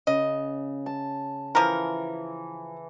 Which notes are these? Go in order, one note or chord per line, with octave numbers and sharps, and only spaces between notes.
C#3 D#5
A5
E3 F3 A#4